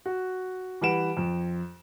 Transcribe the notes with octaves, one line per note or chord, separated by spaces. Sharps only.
F#4
E3 G3 B4 F#5 D7 E7
F2